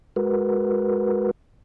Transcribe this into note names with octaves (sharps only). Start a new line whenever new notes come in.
G#3 F#4 A#4 B4